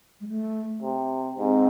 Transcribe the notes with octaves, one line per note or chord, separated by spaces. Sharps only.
G#3
A3
C3
G#2 C4